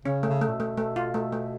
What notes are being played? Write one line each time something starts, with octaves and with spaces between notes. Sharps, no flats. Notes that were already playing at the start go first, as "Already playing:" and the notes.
C#3 C#4
A3
C#3
A3
A#2
B2
A3
A3
F4
A3
A3